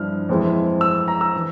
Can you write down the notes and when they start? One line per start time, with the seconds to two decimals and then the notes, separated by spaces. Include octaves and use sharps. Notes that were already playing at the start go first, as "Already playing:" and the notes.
Already playing: G2 F3 E4 F6
0.29 F2 E3 G#3 C4 E4
0.81 E6
1.08 A#5
1.21 E6
1.35 E3